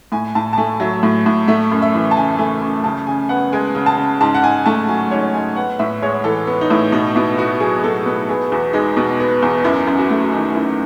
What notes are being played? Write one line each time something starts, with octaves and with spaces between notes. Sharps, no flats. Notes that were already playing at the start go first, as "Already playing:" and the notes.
A2 G#5
A2 A5
A5
A3 G#5
F#3 E5
A2
A2
A3 E5
F#2
E5
E3
A5
C#3 G#5
A3 G#5
F#2
C#3 A5
C#3 G#5
B3 F#5
G#3 G#5
C#3
A5
C#3
G#2 A5
F#5
G#2 G#5
A3 A5
F#3 G#5
G#2 C#5
G#2 G#5
B3 F#5
A2 E5
G#3 C#5
E3 A4
B3
D#4
A2 E4
B2 D#4
B2 E4
B3 F#4
F#3 G#4
B2 A4
B2 B4
B3 G#4
E2 F#4
G#3 D#4
B2
B3
E2
F#2 E4
F#2
F#4
A3
D#3 D#4
F#2 E4